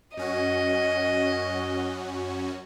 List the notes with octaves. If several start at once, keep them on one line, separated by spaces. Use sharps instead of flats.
F#2 C#4 F#4 D#5